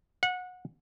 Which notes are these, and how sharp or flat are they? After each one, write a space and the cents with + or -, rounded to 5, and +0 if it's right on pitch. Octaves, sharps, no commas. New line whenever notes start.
F#5 -25